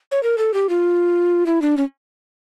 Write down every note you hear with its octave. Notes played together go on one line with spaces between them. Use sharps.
C#5
A#4
A4
G4
F4
E4
D4
C#4